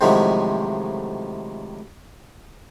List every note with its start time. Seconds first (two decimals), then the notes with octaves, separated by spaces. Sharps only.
0.01 A2 C3 D#3 F3 F#3 G#3